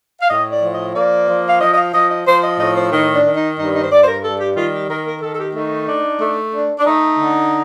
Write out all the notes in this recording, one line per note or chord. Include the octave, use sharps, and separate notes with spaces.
F5
A2 D#5
D5
F3
D#5
A#3 D5
F3
F5
F3 D#5
D#5
F5
F3 D#5
D#5
F3 C5
D#5
A2 D#5
C5
D#3 D#4
D4
D#3
D#4
G2 D#4
D#4
C5
G2 D5
C5
A#4
G3 A4
G4
D#3 F4
G4
D#3 A#4
A#4
D#3 A4
A4
G4
A3 D#4
D4
A3
D4
D4
A3 D#4
D3